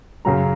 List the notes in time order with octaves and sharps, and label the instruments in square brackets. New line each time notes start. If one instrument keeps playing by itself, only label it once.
[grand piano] F#2 C#3 F#3 A#5